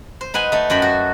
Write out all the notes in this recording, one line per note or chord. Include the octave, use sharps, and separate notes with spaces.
C5
D#4 B4 F#5 G#5
A3 D#4
F#2 F#4 G5 B5
F#4